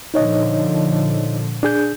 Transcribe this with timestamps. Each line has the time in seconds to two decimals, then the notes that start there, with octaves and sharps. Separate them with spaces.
0.14 A#2 D3 F3 D#4 C#5 D#5
1.63 D4 G#4 G6